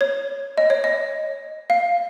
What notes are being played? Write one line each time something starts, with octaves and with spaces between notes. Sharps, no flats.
C#5
D#5
C#5
D#5
F5